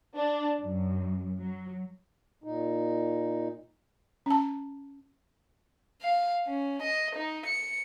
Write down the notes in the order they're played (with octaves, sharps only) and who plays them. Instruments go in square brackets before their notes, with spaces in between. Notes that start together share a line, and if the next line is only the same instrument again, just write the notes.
[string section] D4
F#2
F#3
[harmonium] A#2 D#4
[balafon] C#4 A5
[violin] F5
C#4
D#5
D#4
C#7